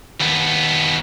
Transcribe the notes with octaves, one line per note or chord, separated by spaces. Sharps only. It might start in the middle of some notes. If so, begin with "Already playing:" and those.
D#2 B3